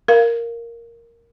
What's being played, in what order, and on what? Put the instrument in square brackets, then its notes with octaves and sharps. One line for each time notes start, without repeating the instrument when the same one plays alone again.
[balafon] A#4 F5